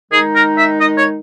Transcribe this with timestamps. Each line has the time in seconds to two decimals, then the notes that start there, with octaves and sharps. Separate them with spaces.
0.12 D#3 G#3 D#4 G#4
0.35 A#4
0.58 E5
0.80 D#5
0.98 C#5